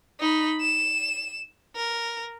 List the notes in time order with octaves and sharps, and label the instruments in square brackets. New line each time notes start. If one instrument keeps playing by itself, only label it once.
[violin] D#4 B5
E7
A#4